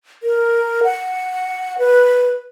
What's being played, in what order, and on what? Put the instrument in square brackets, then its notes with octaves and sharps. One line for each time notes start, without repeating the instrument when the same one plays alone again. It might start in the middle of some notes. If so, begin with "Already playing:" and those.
[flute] A#4
F#5
B4